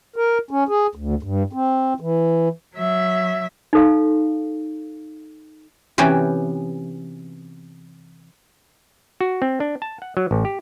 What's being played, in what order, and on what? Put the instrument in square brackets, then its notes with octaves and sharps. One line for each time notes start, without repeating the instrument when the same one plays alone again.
[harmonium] A#4
C#4
G#4
D2
G2
C4
E3
[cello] F#3 E5
[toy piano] D#4 A4 F5
[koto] C3 E3 B3 C#4 F#4 G4
[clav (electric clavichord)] F#4
C4
D4
A5
F#5
F#3
A1
G4